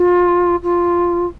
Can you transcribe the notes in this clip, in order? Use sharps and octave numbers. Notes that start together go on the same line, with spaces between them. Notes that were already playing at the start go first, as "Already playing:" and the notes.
Already playing: F4
F4